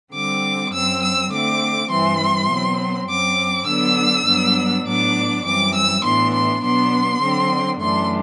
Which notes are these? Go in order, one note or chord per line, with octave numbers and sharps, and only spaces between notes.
D3 G3 C4 D6
F#2 F#3 C4 E6
E6
D3 A3 C4 D6
G2 E3 G3 C4 C6
B2 F#3 C4
F#2 F#3 C4 D6
D3 F#3 B3 D4 E6
G2 F#3 B3 D4
A2 F#3 B3 D4 D6
F#2 E3 G3 C4 D6
E6
A2 E3 B3 D4 C6
C6
B2 F#3 B3 D4 C6
D3 F#3 C4
F#2 E3 A3 D4 C6